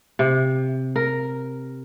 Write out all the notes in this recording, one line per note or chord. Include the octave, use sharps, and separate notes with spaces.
C3
A#4